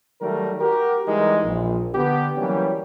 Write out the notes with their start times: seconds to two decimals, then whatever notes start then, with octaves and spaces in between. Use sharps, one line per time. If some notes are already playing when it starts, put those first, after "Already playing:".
0.21 D#3 F#3 G3 A3 A#4
0.60 F#4 G4 A#4
1.06 E3 G3 G#3 D#4 G4 A#4
1.45 A#1
1.95 D3 B3 G4
2.37 E3 F#3 G3 A#3 C#4 G4